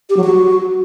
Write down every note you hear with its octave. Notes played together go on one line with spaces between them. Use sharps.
G4
F#3
F#4